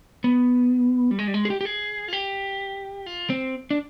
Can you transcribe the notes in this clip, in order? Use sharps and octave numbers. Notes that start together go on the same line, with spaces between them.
B3
G3
G#3
G3
G#3
G#4
G4
G4
G#4
F4
G4
F4
C4
D4